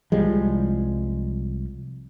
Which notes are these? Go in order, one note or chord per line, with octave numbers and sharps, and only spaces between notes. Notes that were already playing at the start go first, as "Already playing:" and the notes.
C2 F3 G3 G#3